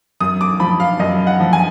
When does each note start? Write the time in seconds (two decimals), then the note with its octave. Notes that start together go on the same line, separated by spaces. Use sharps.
0.20 F#2 D#6
0.41 D6
0.60 F3 B5
0.80 F5
0.99 F#2 D#5
1.27 F#5
1.40 F3
1.53 G#5